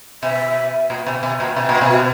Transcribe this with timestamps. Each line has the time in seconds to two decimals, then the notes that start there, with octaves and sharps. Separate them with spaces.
0.23 B2 E5
0.90 A#2
1.07 B2
1.23 B2
1.40 A#2
1.56 B2
1.69 A#2
1.81 B2
1.90 F#4